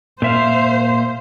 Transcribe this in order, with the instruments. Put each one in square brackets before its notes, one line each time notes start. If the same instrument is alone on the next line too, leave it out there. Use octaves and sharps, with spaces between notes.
[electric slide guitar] A#2 E5 F5 [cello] C5